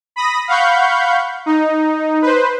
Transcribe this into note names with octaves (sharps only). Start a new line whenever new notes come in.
B5 D#6 A#6
F5 F#5 B5 C#6 G6
D#4
B4 C5